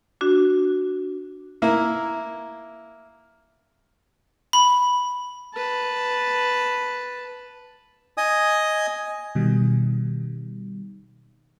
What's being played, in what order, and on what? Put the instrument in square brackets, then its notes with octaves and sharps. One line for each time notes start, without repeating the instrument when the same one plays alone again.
[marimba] D4 F#4
[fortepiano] A#3 E4
[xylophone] B5
[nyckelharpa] B4 A5
[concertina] D#5 G#5 D#6
[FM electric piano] B2 D#3 G3